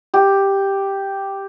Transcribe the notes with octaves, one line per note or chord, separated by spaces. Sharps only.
G4